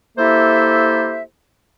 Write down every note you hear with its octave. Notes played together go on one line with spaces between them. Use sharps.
A#3 E4 G4 A4 C5 E5